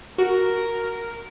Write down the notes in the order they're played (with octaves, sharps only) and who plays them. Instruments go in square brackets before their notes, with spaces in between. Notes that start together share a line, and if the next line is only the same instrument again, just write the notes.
[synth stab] F#4 [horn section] A#4